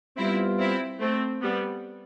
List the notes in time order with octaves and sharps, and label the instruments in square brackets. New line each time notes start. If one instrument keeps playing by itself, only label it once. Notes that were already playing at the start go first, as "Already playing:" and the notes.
[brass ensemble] G3 B3 F4 [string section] C4 E4
[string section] C4 E4
A3 C4
G3 B3